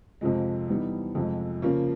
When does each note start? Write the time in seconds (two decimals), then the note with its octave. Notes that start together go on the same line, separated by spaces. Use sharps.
0.21 F2 C3 F3 G#3
0.68 E3 G3 B3 D#4
1.15 F2 C3 F3 G#3
1.62 C#3 F3 A#3